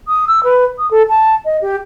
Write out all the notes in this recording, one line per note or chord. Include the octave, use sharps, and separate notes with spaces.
D#6
E6
B4
D#6
A4
A5
D#5
G4